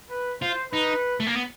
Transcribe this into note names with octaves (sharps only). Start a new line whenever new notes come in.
B4
F4 C5
D#4 B4
A3
A#3
B3